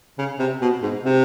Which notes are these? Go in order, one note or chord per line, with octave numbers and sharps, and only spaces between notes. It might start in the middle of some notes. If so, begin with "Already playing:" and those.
C#3
C3
B2
G#2
C3